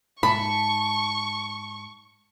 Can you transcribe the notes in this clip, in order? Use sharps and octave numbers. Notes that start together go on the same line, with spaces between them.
G#2 A5 B5 C#6